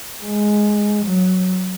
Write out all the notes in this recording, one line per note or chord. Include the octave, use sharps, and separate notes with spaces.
G#3
F#3